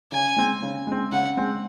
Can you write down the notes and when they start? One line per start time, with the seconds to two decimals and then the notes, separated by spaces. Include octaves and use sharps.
0.12 C#3 G#5
0.36 G#3 C4
0.62 C#3
0.87 G#3 C4
1.12 C#3 F#5
1.37 G#3 C4